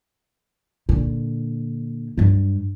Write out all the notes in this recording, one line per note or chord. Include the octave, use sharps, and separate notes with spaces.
A#2 D3
G2 F#3